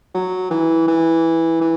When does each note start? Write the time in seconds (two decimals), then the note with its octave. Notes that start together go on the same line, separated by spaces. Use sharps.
0.14 F#3
0.51 E3
0.87 E3
1.61 E3